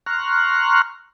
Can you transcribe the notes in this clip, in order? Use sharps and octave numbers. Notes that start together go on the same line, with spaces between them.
A#5 C6 C#6 F6 F#6